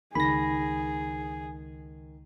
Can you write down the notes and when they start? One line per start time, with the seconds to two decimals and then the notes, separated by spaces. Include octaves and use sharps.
0.15 C#2 D#3 G#4 B5 A#6